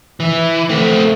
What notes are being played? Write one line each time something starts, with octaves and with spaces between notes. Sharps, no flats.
E3
A3 C4